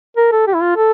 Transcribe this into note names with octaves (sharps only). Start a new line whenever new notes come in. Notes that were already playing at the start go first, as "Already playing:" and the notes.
A#4
A4
G4
E4
F4
A4